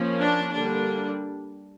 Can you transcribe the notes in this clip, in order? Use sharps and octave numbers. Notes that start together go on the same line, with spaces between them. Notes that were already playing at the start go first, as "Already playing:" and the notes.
Already playing: F3 A#3 C#4
D4
D3 G3 A#3 D4